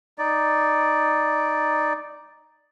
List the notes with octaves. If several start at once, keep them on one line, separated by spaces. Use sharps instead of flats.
D#4 D5